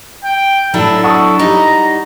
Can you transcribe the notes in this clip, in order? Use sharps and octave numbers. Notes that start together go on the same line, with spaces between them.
G5
A2 F#3 D4 E4 A4
A4 F#5 C#6 D#6
G3 D#4 A#5